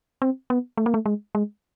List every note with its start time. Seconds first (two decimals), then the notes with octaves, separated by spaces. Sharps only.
0.22 C4
0.50 B3
0.77 A3
0.86 A#3
0.94 A3
1.06 G#3
1.35 G#3